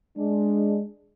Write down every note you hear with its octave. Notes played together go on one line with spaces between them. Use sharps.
G#3 D4